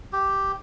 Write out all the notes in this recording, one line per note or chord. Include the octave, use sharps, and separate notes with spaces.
G4